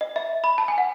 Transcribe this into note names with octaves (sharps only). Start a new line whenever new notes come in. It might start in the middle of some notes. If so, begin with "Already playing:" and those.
D#5
E5
B5
A5
G#5
F#5